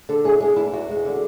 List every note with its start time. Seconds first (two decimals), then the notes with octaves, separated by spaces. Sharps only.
0.09 D3 A4
0.24 E2 G#4
0.40 G#3 G#4
0.56 E2 E4
0.73 E2 F#4
0.89 G#3
1.05 D3